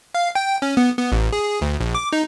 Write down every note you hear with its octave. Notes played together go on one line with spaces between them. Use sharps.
F5
G5
C#4
B3
B3
A1
G#4
D2
A#1
D6
D#4